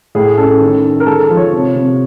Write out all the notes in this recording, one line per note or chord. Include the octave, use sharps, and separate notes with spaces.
A2 G#4
C#4 A4
D#3
D#3
A#4
G#3 A4
F3
C#5
C3
C3